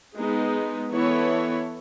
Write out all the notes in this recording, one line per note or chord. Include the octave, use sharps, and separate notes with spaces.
G#3 B3 D#4
E3 B3 E4 A4 C#5